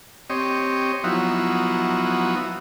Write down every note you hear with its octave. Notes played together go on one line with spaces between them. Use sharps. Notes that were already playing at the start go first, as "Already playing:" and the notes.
C4 G4 C#5 D#5
F3 F#3 B3 D#4 E4 F#4